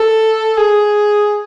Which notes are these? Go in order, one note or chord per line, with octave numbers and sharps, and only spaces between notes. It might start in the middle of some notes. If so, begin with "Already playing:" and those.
Already playing: A4
G#4